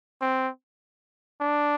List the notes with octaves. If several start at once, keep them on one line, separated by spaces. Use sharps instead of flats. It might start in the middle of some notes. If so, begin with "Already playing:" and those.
C4
D4